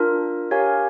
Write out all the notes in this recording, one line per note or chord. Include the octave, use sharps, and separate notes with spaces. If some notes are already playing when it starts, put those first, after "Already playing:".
Already playing: D4 F4 A#4
G4 A#4 C#5 F5 G#5